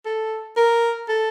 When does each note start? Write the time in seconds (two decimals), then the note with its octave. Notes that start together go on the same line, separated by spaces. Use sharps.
0.06 A4
0.57 A#4
1.09 A4